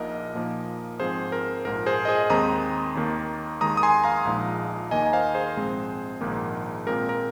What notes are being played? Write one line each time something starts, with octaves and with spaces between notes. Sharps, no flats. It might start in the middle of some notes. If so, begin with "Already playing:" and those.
Already playing: A#1 A#2 A#3 D#4 A#4 D#5
A#2 F3 A#3 D#4
G#2 F3 C4 G#4 C5
A#4
A#1 G#2 F3 A#4
G#4 C5
D#5
G#4 C5
D#2 D#3 G#3 C4 A#5 D#6
D#2 D#3 A#3
D#2 D#3 G#3 A#5 D#6
D#6
G#5 C6
F5 A#5
A#1 A#2 F3 G#3 D#4
D#2 D#3 A#3 D#4 D#5 G#5
G#5
C5 F5
G#4 C5
A#1 G#2 G#3 C4
A#1 G#2 D#3 A#3
A#2 G#3 C4 A#4
A#4